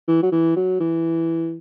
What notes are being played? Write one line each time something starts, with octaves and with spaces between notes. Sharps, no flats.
E3
F#3
E3
F#3
E3